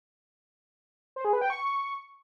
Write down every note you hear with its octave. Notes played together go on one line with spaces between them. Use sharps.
C5
G#4
B4
G5
C#6